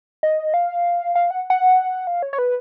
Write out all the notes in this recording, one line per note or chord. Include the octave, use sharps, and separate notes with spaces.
D#5
F5
F5
F#5
F#5
F5
C#5
C#5
B4